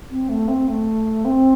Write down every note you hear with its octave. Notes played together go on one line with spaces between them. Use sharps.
C4
A3
C4
A3
C4